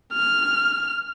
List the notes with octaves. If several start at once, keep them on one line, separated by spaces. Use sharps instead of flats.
F6